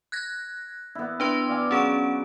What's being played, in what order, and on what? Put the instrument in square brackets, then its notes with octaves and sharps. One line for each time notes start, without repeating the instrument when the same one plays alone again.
[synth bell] F#6 G#6 A#6
[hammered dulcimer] B3 E4
[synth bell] D4 B4 C6 [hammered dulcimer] E4
[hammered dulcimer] D5 F5 G#5
[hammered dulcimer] F#3 [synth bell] C#4 G#4 D7